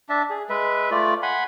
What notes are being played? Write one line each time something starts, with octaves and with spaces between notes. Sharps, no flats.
D4 E5 A5
G#4
G#3 B4 E5
A3 F4 D5
F#5 G#5 B5 C6